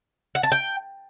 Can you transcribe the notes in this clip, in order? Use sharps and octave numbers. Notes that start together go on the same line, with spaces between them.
F#5
A5
G5